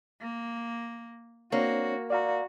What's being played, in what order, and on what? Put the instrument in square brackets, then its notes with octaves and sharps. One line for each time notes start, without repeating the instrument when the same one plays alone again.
[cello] A#3
[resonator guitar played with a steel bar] A#3 [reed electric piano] C4 D4 C#5 [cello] F#4
[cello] F#4 [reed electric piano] D5 F5 A#5